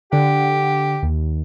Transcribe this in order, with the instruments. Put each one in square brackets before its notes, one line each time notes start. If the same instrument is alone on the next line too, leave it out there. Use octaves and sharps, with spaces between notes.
[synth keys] D3 F#5 [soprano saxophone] G4
[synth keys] D#2